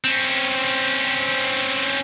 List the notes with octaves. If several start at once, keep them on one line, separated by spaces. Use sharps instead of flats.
C4 C#4